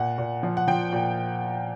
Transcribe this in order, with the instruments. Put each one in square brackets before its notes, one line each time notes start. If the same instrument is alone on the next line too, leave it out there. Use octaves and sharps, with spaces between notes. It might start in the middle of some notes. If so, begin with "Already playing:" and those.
Already playing: [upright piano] A#2 F#5
A#2
F3
F#5
F3 G5
A#2